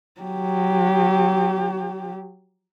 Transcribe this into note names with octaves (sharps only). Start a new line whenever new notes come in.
F#3 G4